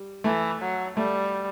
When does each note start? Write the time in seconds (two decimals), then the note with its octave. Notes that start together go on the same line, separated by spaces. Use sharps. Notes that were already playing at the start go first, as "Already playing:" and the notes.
Already playing: G3
0.24 E3 A3
0.61 F#3
0.96 G3 A3